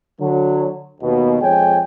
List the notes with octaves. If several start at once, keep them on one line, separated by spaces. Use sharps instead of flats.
D3 F#3
D#2 B2
F2 G#3 C#5 G5 G#5